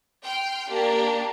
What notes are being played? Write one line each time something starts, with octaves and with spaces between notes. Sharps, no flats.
G5 C6 F6
A#3 D4 G4